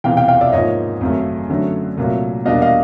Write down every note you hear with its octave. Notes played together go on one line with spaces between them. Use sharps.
E1 E2 C3 E3 F5 G5
F5 G5
F5 G5
D5 E5
G#2 F3 A#3 C#5 D#5
G#1 F#2 C#3 F#3 A3
F#2 D3 F#3 A3
C2 A#2 F#3 A3
E2 B2 G3 A#3 D4 D#5 F5
D#5 F5